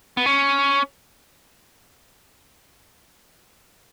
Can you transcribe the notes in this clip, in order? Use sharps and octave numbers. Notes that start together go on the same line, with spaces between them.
B3
C#4